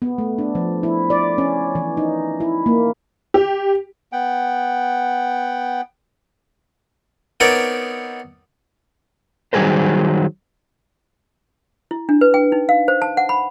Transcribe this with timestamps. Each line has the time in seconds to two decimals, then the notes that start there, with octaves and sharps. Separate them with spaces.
0.02 B3
0.18 A3
0.38 D4
0.55 F3
0.83 E4
1.10 D5
1.38 C#4
1.75 E3
1.97 D#4
2.40 E4
2.66 A#3
3.34 G4
4.12 B3 F#5 G5
7.40 B3 C4 D#4 A#4 C#5 D5
9.53 D#3 F#3 G3 G#4 A#4 C5
11.91 E4
12.09 D4
12.21 B4
12.34 G5
12.52 D#4
12.69 F5
12.88 C5
13.02 A5
13.17 F#5
13.29 B5